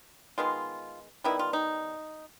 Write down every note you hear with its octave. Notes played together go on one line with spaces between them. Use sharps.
D#3 G#3 B3 F4
D#3 G3 B3 E4
F4
D#4